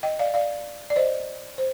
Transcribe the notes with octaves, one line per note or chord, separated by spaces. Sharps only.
D#5 G5
D5 F5
D5 F5
D5
C5 D#5
C5